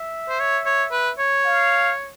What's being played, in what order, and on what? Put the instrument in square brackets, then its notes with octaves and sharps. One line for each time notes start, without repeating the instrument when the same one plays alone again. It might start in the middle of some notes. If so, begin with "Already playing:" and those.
Already playing: [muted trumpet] E5
[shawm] C5
C#5
C#5
B4
C#5
[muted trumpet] F5